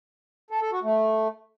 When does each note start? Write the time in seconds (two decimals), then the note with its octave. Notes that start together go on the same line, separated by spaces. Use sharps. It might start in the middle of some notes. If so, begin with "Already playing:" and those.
0.51 A4
0.61 A4
0.72 F#4
0.83 A3